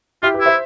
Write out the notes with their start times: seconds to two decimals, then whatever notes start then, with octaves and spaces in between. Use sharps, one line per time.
0.23 E4 F4 G4
0.34 G4 B4
0.40 E4
0.46 C5 E5